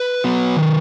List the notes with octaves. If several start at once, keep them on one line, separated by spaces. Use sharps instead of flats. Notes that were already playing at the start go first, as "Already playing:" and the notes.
Already playing: B4
F#3 B3
D#3